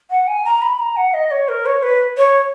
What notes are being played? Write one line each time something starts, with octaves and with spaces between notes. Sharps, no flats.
F#5
G#5
A#5
B5
A#5
F#5
D#5
C#5
A#4
C#5
B4
C#5